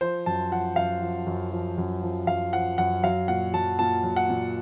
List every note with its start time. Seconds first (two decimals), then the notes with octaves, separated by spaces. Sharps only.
0.01 F3 C5
0.26 F#2 A5
0.52 F3 F#5
0.76 F#2 F5
1.02 F3
1.26 F#2
1.52 F3
1.78 F#2
2.03 F3
2.27 F#2 F5
2.53 F3 F#5
2.78 F#2 F#5
3.03 F#3 F5
3.28 A#2 F#5
3.54 F#3 A5
3.79 A#2 A5
4.04 F#3
4.16 F#5
4.29 A#2